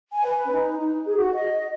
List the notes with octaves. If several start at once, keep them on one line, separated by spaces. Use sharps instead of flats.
G#5
B4
C#4
D#4
D#4
G#4
F#4
D#5